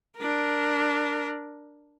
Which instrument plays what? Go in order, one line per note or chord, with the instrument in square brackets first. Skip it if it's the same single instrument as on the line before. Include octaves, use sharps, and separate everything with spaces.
[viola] D4 A#4